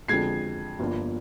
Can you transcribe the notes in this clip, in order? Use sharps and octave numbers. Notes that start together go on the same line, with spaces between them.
F2 D3 G#3 G#6 C7
G1 G2 F3 A#3